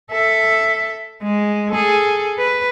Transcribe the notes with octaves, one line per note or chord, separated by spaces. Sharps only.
A4 E5
G#3
G#4 A4
B4